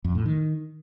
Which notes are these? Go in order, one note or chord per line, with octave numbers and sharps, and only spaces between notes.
F2
A2
D#3